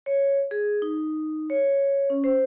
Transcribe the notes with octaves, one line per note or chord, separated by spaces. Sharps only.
C#5
G#4
D#4
C#5
C#4
C5